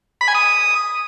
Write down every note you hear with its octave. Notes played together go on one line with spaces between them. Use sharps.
B5
G#5
D#6